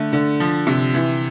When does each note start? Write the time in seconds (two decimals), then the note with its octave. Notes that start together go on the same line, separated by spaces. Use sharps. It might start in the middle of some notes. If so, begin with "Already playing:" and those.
Already playing: D3 A3
0.13 D3
0.40 F3
0.67 C3
0.94 E3